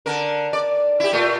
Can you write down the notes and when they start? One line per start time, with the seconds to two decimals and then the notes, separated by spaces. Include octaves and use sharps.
0.06 D3 A#4
0.53 D5
1.00 E4 G4
1.12 A#2 A3 F4